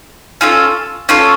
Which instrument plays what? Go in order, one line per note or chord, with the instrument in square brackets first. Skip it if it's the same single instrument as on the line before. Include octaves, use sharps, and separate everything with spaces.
[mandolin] C#4 F4 A4
C#4 F4 A4